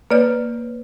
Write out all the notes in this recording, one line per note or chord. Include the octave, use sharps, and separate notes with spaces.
A#3 B4 C#5 D5